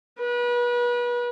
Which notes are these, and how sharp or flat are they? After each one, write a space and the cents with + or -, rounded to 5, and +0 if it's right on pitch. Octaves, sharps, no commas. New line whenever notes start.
B4 -35